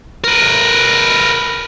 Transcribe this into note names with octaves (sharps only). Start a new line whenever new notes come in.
A#4 B4